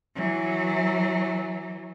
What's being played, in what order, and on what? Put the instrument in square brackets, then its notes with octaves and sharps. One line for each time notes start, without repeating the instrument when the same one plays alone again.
[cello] E3 F#3